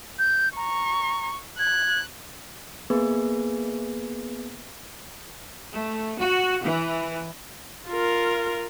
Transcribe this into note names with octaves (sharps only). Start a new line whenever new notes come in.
G6
A#5 C#6
F#6 G#6
A#3 B3 G#4 B4
A3
F#4
E3
F4 A#4